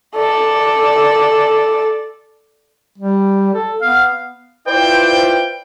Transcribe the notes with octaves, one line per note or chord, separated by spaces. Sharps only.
A4 D5
G3
A4
B3 F5
E4 F4 B4 C5 D5 G5